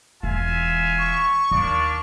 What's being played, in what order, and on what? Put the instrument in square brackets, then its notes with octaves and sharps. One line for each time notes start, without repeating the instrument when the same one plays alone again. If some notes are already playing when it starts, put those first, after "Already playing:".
[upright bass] E1 E3 [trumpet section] F4 E5 G#5
[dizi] C#6
[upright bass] D#2 [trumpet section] A#3 D4 D5